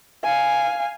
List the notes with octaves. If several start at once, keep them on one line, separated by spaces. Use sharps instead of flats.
F5 G#5